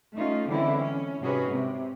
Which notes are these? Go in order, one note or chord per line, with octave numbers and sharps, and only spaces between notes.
A3 C#4 D#4 F4
D3 E3 G#3 C4 C#4 E4
C#4
G#2 C3 C#4 F#4 G#4 B4
C3